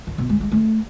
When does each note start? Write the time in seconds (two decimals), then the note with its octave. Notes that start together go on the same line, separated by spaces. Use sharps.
0.07 D#3
0.18 B2
0.29 G#3
0.40 G#3
0.52 A3